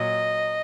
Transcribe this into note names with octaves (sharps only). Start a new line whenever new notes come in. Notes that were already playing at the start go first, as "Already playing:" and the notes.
Already playing: A#2 F#3 D#5